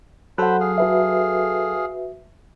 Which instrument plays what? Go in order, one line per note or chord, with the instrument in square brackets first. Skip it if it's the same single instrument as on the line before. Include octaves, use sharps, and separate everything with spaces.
[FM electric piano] F#3 A4 [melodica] C5 B5 [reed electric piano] F#5 F#6
[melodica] G#4 F5
[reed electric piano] F#4 B4 E5